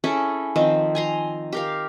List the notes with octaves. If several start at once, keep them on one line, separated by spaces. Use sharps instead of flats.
C#4 E4 G#4 A4
D#3 F3 C4 C5
G#5 A#5 C6
G4 A#4 F5